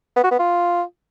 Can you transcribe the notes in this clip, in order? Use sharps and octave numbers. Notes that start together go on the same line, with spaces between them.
B3
F#4
B3
F4